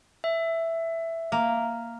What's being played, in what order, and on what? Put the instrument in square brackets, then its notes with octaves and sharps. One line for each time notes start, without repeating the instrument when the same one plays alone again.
[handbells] E5
[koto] A#3